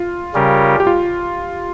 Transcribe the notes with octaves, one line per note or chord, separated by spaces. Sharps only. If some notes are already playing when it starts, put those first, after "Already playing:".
Already playing: F4
C#3 G3 C#4 G4 A#4
G4
F4